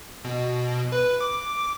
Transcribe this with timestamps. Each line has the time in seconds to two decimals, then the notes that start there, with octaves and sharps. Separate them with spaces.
0.24 B2
0.92 B4
1.21 D6